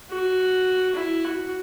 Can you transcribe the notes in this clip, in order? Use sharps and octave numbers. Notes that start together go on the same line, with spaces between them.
F#4
E4
F#4